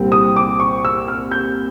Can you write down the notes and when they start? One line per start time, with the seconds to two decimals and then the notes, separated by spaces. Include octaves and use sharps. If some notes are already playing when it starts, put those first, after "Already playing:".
Already playing: C2 A#2 G3 C4
0.12 D#6
0.36 D6
0.60 C#6
0.85 E6
1.08 F6
1.31 G6